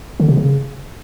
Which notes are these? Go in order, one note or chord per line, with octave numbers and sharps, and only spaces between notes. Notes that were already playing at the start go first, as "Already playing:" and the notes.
D3
C3
C#3